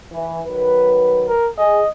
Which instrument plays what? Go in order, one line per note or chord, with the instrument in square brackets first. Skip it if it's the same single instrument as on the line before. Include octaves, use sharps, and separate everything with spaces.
[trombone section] E3
D#3 F#3 B4
[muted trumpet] A#4
[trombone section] G#4 [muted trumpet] D#5